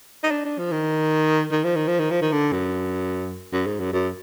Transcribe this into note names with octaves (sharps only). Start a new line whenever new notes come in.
D#4
D4
D4
F3
D#3
D#3
F3
D#3
F3
D#3
F3
D#3
D3
F#2
F#2
G#2
F#2
F#2